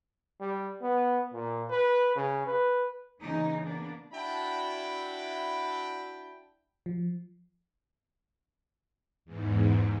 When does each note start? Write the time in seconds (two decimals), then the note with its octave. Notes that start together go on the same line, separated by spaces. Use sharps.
0.41 G3
0.82 B3
1.34 A#2
1.70 B4
2.16 C#3
2.46 B4
3.22 C#3 E3 A#3 C#4 D#4
3.65 A#3 B3 D4
4.13 D4 E4 F#4 G5 A5 B5
6.86 F3
9.25 E2 G#2